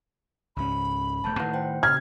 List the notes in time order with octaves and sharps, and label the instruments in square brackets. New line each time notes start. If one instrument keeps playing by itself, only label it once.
[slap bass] C#2 G#2 C#4 [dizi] B5
[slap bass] E1 A3 [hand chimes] A5 G6
[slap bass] A2 D#3 [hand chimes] E4 B4 F#5
[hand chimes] C5 G5
[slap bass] A#2 C#3 [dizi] F6 [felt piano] G#6